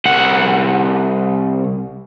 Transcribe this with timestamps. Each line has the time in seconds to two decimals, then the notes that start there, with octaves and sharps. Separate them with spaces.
0.05 C2 F#5